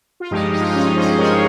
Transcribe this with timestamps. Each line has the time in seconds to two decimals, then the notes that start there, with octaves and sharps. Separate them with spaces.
0.20 F4
0.31 G2 F3 G#3 D#4 G4
0.53 D#4
0.60 F4
0.67 D#4
0.75 C#4 F4
0.96 G#4 C5
1.18 G2 F3 G#3 A#4 C#5